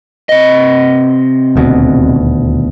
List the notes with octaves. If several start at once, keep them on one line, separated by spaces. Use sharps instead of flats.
C3 D#5
D#1 D2 B2